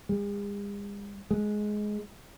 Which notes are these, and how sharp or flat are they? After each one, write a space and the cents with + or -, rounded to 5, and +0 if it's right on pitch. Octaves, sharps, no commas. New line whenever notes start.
G#3 -45
G#3 +10